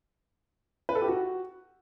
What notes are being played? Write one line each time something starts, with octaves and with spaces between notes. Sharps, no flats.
B4
A4
G4
F#4